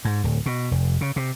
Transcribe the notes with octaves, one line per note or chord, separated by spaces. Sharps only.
G#2
D1
B2
F1
C#3
C3